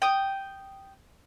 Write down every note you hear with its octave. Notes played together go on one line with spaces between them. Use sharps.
G5 D#6